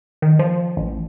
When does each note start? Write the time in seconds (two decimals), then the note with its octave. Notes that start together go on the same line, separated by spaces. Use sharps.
0.22 D#3
0.39 F3
0.77 A1